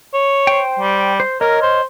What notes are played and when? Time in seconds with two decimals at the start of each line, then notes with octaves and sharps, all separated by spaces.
0.14 C#5
0.47 C5 G5
0.79 G3
1.20 C5
1.41 A#4 C#5 D#5 F6
1.62 C5